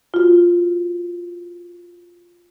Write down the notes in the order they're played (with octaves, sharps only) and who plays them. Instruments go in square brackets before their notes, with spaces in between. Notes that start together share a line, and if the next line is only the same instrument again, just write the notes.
[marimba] F4 F#4